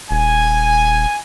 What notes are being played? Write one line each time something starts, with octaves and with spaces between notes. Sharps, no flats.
D#1 G#5